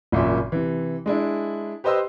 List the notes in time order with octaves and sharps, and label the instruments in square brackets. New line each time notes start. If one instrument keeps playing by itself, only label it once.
[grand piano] G#1 F#2 A#2 C#3 E5
C3 E3
G#3 D4 E4
G4 B4 C5 D#5 C6 E6